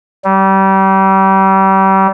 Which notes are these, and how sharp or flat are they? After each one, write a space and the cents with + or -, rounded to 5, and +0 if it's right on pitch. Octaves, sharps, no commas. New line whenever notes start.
G3 -30